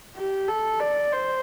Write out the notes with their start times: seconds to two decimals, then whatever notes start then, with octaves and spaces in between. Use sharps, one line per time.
0.16 G4
0.48 A4
0.80 D5
1.12 C5